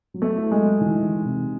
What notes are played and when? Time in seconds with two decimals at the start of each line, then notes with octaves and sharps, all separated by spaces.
0.14 F#3
0.22 A3
0.36 E4
0.51 G#3
0.58 F#3
0.81 E3
1.02 D#4
1.25 C3